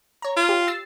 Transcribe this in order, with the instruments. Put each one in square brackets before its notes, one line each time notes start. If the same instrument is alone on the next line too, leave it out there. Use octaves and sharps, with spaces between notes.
[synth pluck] C#5 A#5
[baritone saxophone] F4
[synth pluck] G4
E6 A6 C7